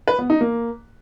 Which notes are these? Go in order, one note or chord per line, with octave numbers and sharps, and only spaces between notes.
B4
B3
D#4
A#3